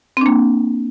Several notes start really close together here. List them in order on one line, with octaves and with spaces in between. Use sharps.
C4 D4 A#3